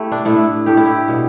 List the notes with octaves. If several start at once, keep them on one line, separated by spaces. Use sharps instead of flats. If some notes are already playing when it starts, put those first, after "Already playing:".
Already playing: A3 E4 G4
D4
A2 A3 E4
A2 A3 G4
E4
G4
B2 G3